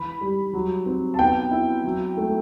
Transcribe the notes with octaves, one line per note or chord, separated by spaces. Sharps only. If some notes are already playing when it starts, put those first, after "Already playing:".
Already playing: E3 B5
G3
F#3
C4
A5
B3 G5
E4
F#3
A3